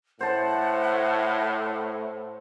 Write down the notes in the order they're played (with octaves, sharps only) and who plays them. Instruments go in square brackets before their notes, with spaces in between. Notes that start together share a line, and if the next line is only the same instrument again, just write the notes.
[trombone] A2 [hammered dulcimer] C5 A5 [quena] F#5